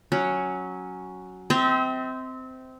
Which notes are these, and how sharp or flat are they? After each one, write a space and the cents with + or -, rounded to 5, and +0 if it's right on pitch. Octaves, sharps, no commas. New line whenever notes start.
F#3 +0 C#4 +0
C4 -15 E5 -45 A#5 -5